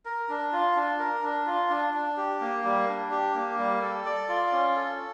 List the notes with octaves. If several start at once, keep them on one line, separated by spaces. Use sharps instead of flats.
A#4
D4
F4
D4
A#4
D4
F4
D4
D4
G4
A#3
G3
D4
G4
A#3
G3
A4
D5
F4
C#4
A4